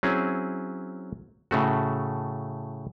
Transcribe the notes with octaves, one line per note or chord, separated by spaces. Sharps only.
F#3 C4 C#4 E4 G#4
A2 C#3 A3 F#4